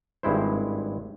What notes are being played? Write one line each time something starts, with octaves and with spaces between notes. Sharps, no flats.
G#1 G2 G#3 E4 C5